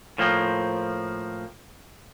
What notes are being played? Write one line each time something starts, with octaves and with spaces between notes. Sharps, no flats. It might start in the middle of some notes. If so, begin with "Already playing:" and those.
A2 F3 A#3 C4